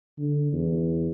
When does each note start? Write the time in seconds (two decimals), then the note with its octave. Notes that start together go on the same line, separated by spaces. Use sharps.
0.18 D3
0.52 E2